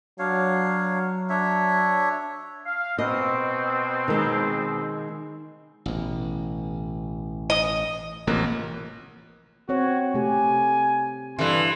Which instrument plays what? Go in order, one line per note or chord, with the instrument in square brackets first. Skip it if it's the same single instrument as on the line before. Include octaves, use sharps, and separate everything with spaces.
[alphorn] F#3 [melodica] D4 C#5 F5
[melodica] D4 C#5 E5
[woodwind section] F5
[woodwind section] B2 C4 [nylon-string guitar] D#5
[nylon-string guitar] D#3 G#3
[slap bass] A1 B2
[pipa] D#5
[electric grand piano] A1 A#3 F#6 [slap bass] C3 F3
[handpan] C4 C#5 [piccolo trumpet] F#4
[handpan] C3 A3 G4 [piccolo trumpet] G#5
[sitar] G2 E3 [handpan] C3 A4 [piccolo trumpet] C6